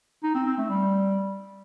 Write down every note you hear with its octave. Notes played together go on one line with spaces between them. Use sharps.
D#4
C4
C4
A3
G3